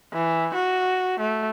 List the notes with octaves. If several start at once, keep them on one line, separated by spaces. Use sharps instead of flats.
E3
F#4
A3